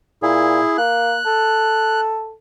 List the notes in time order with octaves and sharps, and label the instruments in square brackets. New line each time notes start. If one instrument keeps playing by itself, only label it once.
[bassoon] A#2 [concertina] E4 G#4
[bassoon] A#3 [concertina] F#6
[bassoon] A4